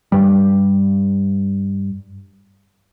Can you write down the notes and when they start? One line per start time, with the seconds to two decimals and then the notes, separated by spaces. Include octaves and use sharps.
0.12 G2 G3